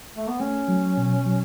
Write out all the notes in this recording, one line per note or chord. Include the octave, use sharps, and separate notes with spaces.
A3
B3
A3 C#4
F#3
B2
F#3